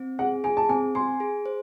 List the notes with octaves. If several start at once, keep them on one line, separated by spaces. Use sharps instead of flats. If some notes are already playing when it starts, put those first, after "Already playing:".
Already playing: C4
G#4 F#5
G#4 G#5
A5
C4 G#5
G#5 C6
G#4
C5